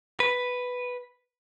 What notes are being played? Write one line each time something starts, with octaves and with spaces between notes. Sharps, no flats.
B4